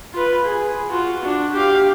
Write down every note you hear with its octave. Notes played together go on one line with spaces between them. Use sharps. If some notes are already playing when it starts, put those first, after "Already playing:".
F4 B4
G#4
F4 F#4
D4 F#4
G4 F5